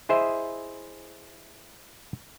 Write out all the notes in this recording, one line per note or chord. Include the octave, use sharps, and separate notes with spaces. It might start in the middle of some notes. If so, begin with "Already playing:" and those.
E4 G#4 C5 D#5 E5